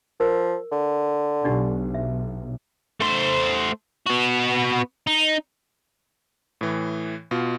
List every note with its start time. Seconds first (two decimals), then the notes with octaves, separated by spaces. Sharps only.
0.20 F3 A#4
0.72 D3
1.44 B1 D4 D#4 G4
1.94 E5
3.01 A3 C5
4.07 B3 F#4
5.07 D#4
6.61 A2 E3
7.31 B2 F4